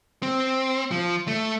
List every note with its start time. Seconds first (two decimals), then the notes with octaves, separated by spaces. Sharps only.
0.23 C4
0.91 F3
1.28 A3